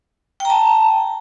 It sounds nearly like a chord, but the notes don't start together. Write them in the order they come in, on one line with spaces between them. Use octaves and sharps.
G5 A#5 A5